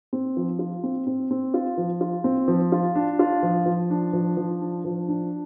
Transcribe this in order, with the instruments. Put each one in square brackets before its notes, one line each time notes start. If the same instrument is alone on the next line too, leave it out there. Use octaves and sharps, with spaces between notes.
[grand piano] C4
F3
F4
C4
C4
C4
F4
F3
F4
C4
F3
F4
D4
F4
F3
F3
D4
F3
F3
D4
F3
D4